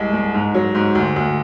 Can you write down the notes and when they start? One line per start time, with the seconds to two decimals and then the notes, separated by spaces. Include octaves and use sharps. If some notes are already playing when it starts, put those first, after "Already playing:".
Already playing: C2 G#3
0.13 G#3
0.34 G#2
0.54 F#3
0.75 G#2
0.95 D2
1.16 D2